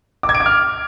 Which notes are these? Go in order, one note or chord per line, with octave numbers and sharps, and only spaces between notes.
D6
G#6
D7
D6
F6